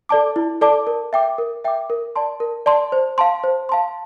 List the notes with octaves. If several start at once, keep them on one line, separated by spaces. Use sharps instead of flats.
A4 D5 A5 D6
E4
A4 D5 A5 D6
A#4
E5 G5 D6
A#4
E5 G5 D6
A#4
D5 A5 C6
A#4
D5 A5 C6
C5
F5 A5 C6
C5
F5 A5 C6